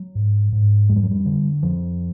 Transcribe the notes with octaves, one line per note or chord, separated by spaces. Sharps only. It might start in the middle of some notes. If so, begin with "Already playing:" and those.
Already playing: F#3
G#2
G#2
F2 G#3
G3
F#3
G3
D3
F2 F3